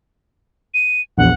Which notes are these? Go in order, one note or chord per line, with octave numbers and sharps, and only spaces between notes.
D#7
A#1 E2 F#5